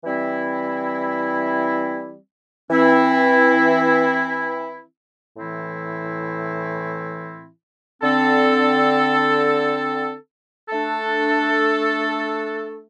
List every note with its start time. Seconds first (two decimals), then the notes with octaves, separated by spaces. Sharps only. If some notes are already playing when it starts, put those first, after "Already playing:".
0.04 E3 G3 C4 E4
2.69 E3 C4 E4
5.36 A2 E3 C4 E4
8.02 D3 C4 A4
10.69 A3 D4 A4